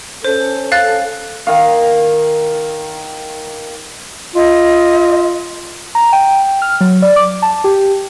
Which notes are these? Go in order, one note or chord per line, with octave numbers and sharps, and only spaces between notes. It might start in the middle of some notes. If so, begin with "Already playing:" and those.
C#4 A4 C5
F5 F#6 A6
D#3 F5
F4 D#5
A#5
G5
F6
F#3
D5
D6
A5
G4